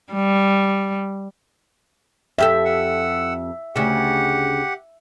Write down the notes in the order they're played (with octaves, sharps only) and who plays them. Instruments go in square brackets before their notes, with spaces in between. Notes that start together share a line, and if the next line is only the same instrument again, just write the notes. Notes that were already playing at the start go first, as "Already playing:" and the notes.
[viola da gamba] G3
[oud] F2 G4 A4 [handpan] E5
[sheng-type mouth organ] F#5 E6
[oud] D2 C#3 [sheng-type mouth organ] G4 F#5